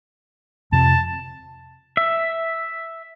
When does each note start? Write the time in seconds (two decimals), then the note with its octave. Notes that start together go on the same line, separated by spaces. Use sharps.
0.72 F2 C3 F3 A5
1.97 E5